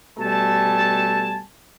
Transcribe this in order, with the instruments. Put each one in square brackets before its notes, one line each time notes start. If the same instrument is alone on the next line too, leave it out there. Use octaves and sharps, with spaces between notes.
[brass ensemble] B2 G3 A3 G#5 A5